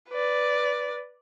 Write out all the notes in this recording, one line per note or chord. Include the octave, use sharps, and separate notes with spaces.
B4 D5